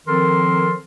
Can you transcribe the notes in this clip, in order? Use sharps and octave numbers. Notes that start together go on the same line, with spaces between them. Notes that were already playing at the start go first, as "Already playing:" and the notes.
D#3 F3 C4 A4 A#4 C6